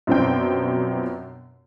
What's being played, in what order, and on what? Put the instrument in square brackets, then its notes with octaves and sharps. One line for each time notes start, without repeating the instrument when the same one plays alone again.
[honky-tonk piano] F#2 B2 F3 C4 D4 G5